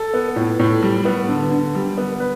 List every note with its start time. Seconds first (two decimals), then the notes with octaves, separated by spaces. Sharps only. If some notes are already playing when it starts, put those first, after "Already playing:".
Already playing: A4
0.14 B3
0.36 A2
0.59 A2
0.83 G3
1.05 B3
1.28 D3
1.51 D3
1.75 G3
1.98 B3
2.20 B4